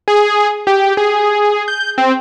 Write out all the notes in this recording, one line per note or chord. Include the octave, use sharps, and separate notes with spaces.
G#4
G4
G#4
G6
C4